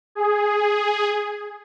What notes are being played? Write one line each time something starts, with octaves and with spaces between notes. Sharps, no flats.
G#4